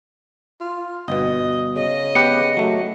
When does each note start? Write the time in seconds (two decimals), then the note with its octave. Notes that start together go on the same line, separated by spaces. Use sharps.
0.61 F4
1.08 G1 B2 D#5
1.76 C#3 D#5
2.15 B3 G4 B4 C#7
2.57 F#3 A3